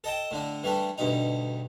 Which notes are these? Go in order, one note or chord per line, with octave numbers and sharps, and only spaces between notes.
A4 D#5 G5 A5
A2 D3 D4
E3 G3 A3 D4
D2 G2 B2 D#4